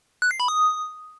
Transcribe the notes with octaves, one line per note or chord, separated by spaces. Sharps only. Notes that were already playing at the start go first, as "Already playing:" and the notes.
F#6
C7
B5
D#6